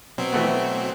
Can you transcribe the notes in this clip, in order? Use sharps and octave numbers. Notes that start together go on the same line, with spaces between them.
B2 F#3 C4
E3 A3 B3